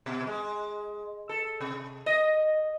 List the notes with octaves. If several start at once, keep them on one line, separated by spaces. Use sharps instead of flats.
B2
G#3
A4
C3
D#5